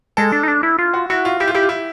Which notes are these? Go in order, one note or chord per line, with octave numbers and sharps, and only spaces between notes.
G#3 A4
D4
D#4
D4
E4
F4
F#4
E4 F#4
F4
E4 G4
F4
E4 G4
F4
E4